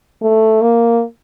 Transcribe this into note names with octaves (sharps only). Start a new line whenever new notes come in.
A3
A#3